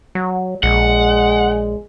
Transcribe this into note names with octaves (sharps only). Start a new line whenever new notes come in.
F#3
A#1 G#3 F#5